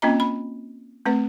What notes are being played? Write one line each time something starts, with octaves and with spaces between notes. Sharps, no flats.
A#3 C4 C#4 F4 D#5 A#5
B5
A3 C4 B4